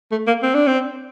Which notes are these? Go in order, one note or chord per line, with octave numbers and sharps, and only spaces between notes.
A3
A#3
C4
D4
C4